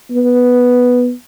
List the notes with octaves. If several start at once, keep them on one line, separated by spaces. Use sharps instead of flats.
B3